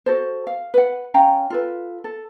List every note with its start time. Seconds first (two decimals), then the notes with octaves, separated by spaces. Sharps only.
0.06 F#4 A4 C5
0.47 F5
0.74 B4 F#5
1.14 C#4 F5 G5 A#5
1.50 F4 A4 B4
2.04 A4